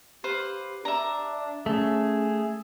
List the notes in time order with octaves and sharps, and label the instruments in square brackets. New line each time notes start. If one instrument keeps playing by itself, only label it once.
[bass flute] G4 [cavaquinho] B4 C5 F5
[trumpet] D4 [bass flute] D5 [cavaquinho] E5 A#5
[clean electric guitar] A3 [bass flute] C#4 [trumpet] G#4